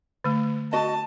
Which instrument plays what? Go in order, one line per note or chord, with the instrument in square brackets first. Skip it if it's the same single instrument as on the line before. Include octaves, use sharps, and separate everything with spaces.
[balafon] D3 A3
[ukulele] F#4 D#5 [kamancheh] A5